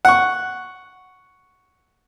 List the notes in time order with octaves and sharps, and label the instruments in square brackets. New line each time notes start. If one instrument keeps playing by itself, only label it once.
[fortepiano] F#5 C#6